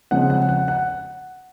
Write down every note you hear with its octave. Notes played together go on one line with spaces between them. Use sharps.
C#3 F3 G#3 C4 F#5
F#5
F#5
F#5